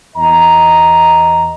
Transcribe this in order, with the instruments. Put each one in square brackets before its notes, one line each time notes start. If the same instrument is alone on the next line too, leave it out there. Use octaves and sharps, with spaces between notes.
[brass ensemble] E2 D#5 A#5